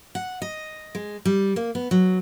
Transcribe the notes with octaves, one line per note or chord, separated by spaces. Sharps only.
F#5
D#5
G#3
G3
A#3
B3
F#3